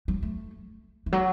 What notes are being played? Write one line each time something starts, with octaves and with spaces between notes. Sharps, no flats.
F#3
A3
E3
F#3